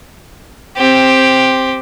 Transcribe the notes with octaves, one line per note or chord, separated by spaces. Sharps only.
C4 G4